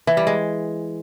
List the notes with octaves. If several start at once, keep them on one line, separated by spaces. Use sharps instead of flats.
E3
G3
G#3